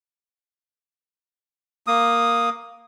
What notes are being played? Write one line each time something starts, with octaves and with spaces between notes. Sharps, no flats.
A#3 D#6